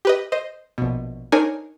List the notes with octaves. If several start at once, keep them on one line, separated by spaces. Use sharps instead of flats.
G4 B4 D#5
C5 D#5
A#1 B2
D4 D#4 A#4 C5 C#5 G#5